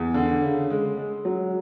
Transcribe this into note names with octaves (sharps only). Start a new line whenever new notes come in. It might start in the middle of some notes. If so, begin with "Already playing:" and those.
Already playing: E2
D3
C#3
G#3
G#3
F#3